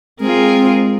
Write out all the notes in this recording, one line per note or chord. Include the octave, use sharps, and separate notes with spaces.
G#3 C4 F4 G#4 A#4